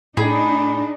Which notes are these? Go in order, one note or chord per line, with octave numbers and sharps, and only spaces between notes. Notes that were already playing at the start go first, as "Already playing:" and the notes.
A2 D4 D#4 G#4 B5